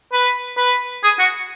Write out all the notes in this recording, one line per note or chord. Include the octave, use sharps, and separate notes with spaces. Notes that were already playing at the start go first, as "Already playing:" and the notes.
B4
B4
G#4
F#4